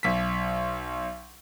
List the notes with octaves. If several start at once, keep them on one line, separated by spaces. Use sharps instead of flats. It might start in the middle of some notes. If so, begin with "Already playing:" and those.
B1 B6